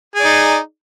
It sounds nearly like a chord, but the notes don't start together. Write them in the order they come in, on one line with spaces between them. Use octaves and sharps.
G#4 D5 D#4